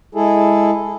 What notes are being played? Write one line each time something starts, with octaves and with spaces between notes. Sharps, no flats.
G#3 E4 G#4 A4